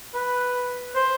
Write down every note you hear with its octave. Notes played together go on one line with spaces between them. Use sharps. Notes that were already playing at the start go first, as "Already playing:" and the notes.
B4
C5